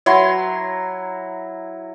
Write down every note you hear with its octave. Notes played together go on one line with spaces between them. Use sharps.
F#3 E4 A#5 C6